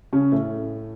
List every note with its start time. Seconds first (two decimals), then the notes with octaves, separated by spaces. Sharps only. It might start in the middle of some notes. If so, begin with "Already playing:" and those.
0.13 C#3 C#4
0.32 A2 A3